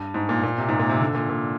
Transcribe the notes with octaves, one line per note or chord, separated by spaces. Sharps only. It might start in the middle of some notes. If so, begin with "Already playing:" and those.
Already playing: G2
G#2
A#2
A#2
C3
G#2
A#2
C3
D3
A#2
A#2